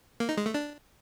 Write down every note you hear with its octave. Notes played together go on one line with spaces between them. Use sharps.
A#3
D#4
G#3
A3
D4